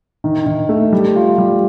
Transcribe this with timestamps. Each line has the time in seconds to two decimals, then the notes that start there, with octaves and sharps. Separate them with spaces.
0.24 D#3
0.46 D#3
0.69 A3
0.92 G3
1.16 F4
1.38 G3